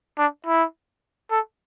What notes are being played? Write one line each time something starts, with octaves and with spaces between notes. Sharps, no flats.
D4
E4
A4